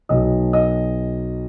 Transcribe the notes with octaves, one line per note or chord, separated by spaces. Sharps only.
B1 B2 F#3 D#5
D#5